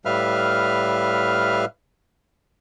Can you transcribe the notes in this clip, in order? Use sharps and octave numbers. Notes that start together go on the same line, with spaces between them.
A2 G3 B4 E5 F5 F6